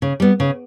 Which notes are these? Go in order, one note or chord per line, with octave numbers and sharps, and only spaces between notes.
C#3
G3 B3
C#3